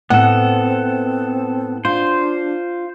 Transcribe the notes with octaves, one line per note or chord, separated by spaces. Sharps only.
A2 B3 C4 A4 F#5
D4 F4 C5